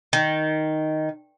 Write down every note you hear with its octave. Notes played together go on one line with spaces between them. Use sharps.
D#3